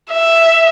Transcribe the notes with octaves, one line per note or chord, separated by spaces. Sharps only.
E5